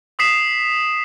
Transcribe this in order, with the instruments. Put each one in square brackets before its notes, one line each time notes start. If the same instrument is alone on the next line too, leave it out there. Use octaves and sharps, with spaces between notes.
[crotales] D6 D#6 B6 C7 E7